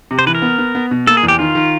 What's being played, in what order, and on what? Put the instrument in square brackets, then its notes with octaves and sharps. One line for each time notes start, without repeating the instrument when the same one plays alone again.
[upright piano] C3
[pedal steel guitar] C5
[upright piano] E3 [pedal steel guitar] B4
[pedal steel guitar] A#4
[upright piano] B3
B3
B3
B2
[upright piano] A#3 [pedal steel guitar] A4
[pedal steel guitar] G#4
[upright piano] E2
[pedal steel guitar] G4
[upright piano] D#3 [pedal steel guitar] F4
[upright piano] D#3